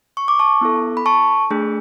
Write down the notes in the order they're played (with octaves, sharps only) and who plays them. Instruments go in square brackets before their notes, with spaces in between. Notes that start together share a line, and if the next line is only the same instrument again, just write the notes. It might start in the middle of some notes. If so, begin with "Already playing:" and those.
[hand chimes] C#6
D6
A5 C#6
B3 E4 A4
B5
A5 C#6
A3 D4 G#4